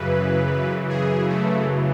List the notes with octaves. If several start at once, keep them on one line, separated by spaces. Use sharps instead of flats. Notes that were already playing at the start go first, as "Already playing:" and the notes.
Already playing: F#2 C#3 E3 B4
G#4
A3